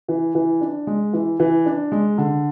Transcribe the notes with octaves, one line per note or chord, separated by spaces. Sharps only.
E3
E3
D4
G#3
E3
E3
D4
G#3
D3